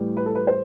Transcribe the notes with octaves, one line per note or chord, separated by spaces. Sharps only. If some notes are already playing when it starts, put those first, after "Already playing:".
Already playing: A2 E3 G3
B4
A4
B4
C5